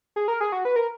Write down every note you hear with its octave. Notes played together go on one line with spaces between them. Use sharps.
G#4
A#4
G#4
F#4
B4
A#4